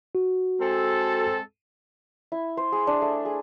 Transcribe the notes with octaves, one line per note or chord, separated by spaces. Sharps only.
F#4
G#3 C4 A4
E4
C5
G#4
D4
A3
G#4